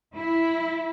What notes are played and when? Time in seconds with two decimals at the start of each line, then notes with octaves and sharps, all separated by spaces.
0.16 E4